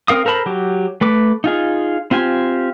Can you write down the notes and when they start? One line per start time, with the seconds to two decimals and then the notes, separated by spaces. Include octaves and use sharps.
0.08 C4 A#4 F5 D#6
0.25 A4 A#4 C5 A5 B5
0.46 F#3 G4
1.01 A3 B4 D6
1.44 D#4 F4 G#4
2.11 C4 F4 G4 G#5